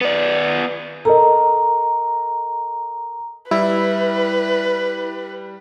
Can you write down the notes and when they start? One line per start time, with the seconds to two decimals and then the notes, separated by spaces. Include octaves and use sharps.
0.01 B3 D5
1.05 A4 A#4 D#5 A#5
3.51 G3 E4 B4